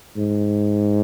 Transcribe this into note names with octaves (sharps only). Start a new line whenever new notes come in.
G#2